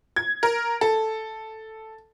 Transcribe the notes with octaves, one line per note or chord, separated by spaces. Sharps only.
G#6
A#4
A4